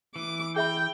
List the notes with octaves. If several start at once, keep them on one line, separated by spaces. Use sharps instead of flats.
E3 D6
G#4 E5 G5 B5